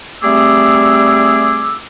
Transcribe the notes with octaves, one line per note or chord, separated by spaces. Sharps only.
G3 A3 C4 G#4 D6 E6